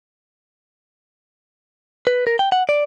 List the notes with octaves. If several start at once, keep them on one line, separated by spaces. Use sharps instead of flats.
B4
A#4
G5
F#5
D5